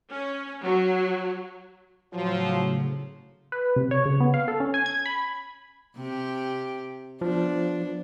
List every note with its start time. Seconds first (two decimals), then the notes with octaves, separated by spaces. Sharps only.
0.10 C#4
0.64 F#3
2.13 A2 C#3 F3 F#3
3.52 B4
3.76 C3
3.91 C#5
4.06 C#3
4.20 B3
4.34 F5
4.48 A4
4.60 C#4
4.74 G#5
4.86 G#6
5.06 B5
5.97 C3 G4
7.21 F3 B3 D4